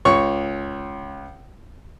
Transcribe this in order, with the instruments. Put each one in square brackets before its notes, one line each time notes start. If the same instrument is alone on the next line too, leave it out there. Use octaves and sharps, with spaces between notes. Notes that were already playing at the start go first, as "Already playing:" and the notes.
[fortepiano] C#2 C#5 C#6